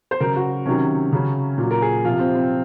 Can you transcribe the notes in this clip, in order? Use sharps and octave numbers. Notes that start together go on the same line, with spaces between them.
C5
C#3 F#3 A#4
F#4
C3 D#3 F#3 C#4
C#3 F#3
A#2
F#3
A#4
G#4
C3 F3 F4
C4
C4